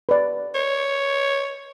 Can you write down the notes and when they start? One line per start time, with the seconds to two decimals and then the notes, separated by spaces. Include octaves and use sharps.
0.09 B4 D5
0.55 C#5